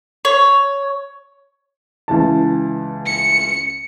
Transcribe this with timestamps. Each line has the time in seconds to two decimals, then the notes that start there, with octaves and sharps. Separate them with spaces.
0.25 C#5
2.08 C#2 E3 A5
3.06 C#7